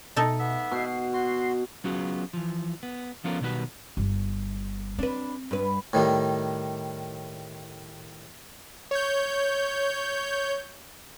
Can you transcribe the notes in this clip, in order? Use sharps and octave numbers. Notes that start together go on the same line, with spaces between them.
B2 A3 D#4 A4
B3 E5
B2 C7
F#4 C6 C7
F#3 B3 C#4 F4 F#4 G#4
E3 F3
B3
F3 B3 C#4 F4 A4 A#4
B1 B2 D#3 G3 F#4 B4
G1
C4 D4 B4
G2 B4
A2 D#3 G3
C#5 G6